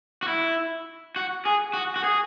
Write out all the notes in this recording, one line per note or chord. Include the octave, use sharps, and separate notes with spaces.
F#4
E4
F#4
G#4
F#4
F#4
G#4